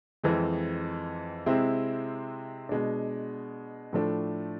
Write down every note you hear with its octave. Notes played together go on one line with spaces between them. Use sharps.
F2 E3 G#3 C4
C3 G#3 C4 E4
B2 G#3 D4
A2 F3 A3 D4